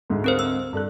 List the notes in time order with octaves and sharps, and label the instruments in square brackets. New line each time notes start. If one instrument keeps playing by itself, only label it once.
[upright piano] D2 G#2
[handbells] C4 A#4 C5
E6
[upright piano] G2 A4 F#6